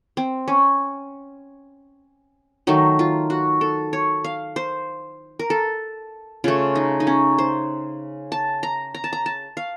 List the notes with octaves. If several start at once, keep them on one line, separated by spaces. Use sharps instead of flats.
C4
C#4
D#3 F#3 A3 D#4
F4
F#4
A4
C#5
F5
C5
A#4
A4
C#3 A3 F4
D#4
D#4
C#4
C5
A5
A#5
A#5
A5
A#5
A5
F5